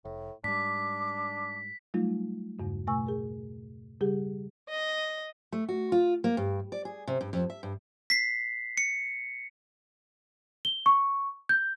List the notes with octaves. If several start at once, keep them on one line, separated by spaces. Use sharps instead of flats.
F1 A2
G#2 G3 D4 D6 B6
F#3 G3 A3 D#4 F4
E2 G2 C#3
B2 A3 G#5 C#6 E6
G#4 A#4
C#3 G3 G4 G#4
D#5
A3
F#4
F4
A#3
G2
D5
G#4
C3
G2
F2
E5
G2
B6 C7
C#7
G7
C#6
G6